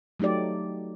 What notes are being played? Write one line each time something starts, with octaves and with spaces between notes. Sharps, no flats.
F#3 A3 D#4 G4 D5